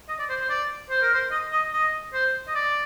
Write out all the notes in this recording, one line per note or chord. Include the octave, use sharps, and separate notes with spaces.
D#5
D5
C5
C5
D5
C5
A#4
C5
D#5
D#5
D#5
C5
D#5
D5